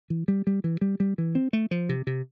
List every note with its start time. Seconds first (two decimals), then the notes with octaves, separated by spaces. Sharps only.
0.10 E3
0.28 G3
0.47 G3
0.64 E3
0.81 G3
1.00 G3
1.18 E3
1.35 C4
1.53 A3
1.71 F3
1.89 C3
2.07 C3